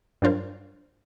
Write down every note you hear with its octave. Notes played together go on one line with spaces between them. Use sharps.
G2 F#3 D4 F4 A#4 C5